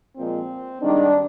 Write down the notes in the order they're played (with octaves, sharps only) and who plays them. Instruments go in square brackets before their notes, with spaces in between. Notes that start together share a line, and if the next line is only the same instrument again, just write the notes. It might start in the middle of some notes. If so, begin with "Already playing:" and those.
[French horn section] A#2 F3 G#3 C4
G#2 D#3 G3 D4